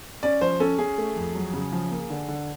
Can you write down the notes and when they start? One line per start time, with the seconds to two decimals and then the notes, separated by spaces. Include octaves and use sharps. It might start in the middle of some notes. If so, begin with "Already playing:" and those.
0.23 C#4 D5
0.41 F3 C5
0.60 C#4 A4
0.78 C#4 G#4
0.98 A3
1.16 F2
1.35 F#3
1.53 C#3
1.72 F3
1.91 A#3
2.10 D3
2.28 D3